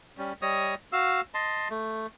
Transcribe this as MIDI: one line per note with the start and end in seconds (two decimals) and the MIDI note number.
0.18 0.33 55
0.18 0.33 61
0.42 0.75 55
0.42 0.75 73
0.42 0.75 75
0.42 0.75 87
0.92 1.21 66
0.92 1.21 77
0.92 1.21 88
1.34 1.68 75
1.34 1.68 81
1.34 1.68 84
1.70 2.07 57